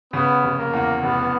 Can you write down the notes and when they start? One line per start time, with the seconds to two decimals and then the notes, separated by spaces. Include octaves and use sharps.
0.13 C#3 B3
0.43 F1
0.58 A#3
0.74 E2
1.03 F1 B3